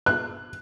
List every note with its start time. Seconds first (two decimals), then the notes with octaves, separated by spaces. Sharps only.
0.06 F#6